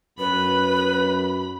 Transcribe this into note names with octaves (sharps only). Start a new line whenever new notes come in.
F#2 B4 B5